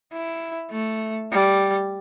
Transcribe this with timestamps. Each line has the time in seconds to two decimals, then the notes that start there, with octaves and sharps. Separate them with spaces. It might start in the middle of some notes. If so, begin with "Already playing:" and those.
0.13 E4
0.72 A3
1.31 G3